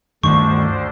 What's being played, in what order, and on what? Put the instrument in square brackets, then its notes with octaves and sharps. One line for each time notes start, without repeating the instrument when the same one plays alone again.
[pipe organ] D2 D3 C5 [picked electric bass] G2 D#3 A3 [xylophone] C#6